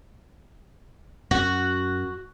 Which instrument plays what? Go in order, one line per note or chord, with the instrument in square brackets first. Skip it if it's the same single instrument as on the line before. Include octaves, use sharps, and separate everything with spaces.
[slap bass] F#2 [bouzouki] F#4